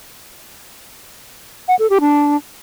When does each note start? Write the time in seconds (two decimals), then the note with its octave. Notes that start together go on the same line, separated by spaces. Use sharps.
1.68 F#5
1.79 A4
1.90 G4
2.01 D4